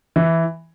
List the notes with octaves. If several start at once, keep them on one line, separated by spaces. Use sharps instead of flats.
E3